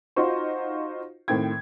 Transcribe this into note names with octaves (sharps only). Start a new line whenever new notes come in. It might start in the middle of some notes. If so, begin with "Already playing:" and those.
D#4 F4 F#4 C5 C#6
A2 D#3 C4 G5 G#6